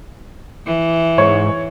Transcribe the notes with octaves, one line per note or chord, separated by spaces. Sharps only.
E3
G#2 C#5